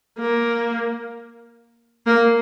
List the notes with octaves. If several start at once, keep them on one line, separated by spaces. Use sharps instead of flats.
A#3
A#3